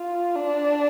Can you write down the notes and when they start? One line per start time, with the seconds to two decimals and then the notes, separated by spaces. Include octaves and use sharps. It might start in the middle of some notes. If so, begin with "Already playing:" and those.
Already playing: F4
0.36 D4